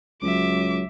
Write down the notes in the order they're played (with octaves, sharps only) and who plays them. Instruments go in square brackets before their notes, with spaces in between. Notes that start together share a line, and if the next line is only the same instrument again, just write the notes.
[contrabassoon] C#2 [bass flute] F#3 [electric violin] E5 D6